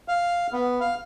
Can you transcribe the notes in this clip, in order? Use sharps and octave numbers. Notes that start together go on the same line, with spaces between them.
F5
B3
F5